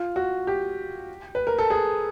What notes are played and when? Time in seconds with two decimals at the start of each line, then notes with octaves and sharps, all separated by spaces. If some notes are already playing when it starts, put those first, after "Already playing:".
Already playing: F4
0.16 F#4
0.47 G4
1.35 B4
1.47 A#4
1.58 A4
1.70 G#4